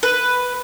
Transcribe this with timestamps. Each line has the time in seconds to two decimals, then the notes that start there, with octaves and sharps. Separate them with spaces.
0.03 B4